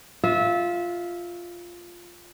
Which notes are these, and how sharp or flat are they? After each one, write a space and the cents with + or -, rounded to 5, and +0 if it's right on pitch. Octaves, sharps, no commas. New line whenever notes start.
F4 +0 E5 -20